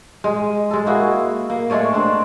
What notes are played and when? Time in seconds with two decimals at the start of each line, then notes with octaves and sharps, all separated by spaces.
0.24 G#3
0.71 G#3 A4
0.86 A#3 E4 F#4 G#4
1.50 A#3
1.70 G#3 A3 C#5 D5
1.93 C4 D4